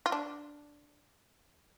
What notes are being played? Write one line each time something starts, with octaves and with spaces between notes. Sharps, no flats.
F4
D4